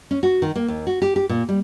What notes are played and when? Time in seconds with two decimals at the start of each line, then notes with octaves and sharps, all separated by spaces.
0.11 C#4
0.23 F#4
0.42 D#3
0.56 A#3
0.68 D#2
0.87 F#4
1.02 G4
1.16 G4
1.29 A#2
1.49 G3